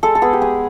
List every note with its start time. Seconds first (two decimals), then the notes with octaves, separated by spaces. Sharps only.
0.03 G#3 A4
0.15 A4
0.22 B3 G#4
0.33 G4
0.42 G#3 G#4